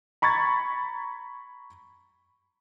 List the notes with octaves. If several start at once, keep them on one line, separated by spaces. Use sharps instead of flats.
A#5 B5 C#6 G#6 A6